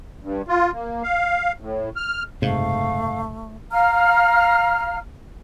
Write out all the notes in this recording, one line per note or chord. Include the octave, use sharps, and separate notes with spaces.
G2
F4
A#3
F5
A2
F6
F#1 G#2 C3 A3 F5
F5 A#5 F6